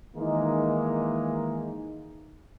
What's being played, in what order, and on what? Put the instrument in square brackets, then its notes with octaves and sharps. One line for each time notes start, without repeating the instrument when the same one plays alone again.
[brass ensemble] D#3 E3 G#3 A#3 D#4